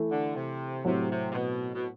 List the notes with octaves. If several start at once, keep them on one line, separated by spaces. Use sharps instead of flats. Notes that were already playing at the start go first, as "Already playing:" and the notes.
Already playing: E3 A3 E4 A4
D3
C3
A2 C3 F#3 C4
C3
C3
B2
B2